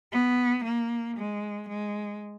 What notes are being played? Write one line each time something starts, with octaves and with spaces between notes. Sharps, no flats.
B3
A#3
G#3
G#3